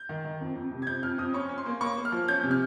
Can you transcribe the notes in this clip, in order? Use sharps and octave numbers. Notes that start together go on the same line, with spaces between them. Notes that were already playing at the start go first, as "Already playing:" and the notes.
Already playing: G6
D#3
D#3
F2
F2
C3
G#6
F2 G6
F2 F6
F2 D#6
C#4 C#6
C#4
C6
A#3
A#3 C#6
A#3
F6
F3
C#4 G6
C3
F6